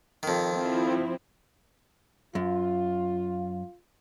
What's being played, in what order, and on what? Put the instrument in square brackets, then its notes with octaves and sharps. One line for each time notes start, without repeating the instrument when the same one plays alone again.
[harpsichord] F2 D#3
[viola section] F3 C4 E4
[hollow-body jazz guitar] F#2 [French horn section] F4